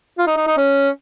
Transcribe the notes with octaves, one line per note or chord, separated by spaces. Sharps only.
F4
D#4
D#4
D#4
C#4